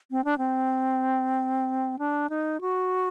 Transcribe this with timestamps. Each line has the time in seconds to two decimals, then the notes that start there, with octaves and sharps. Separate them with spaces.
0.11 C4
0.24 D4
0.38 C4
1.99 D4
2.30 D#4
2.61 F#4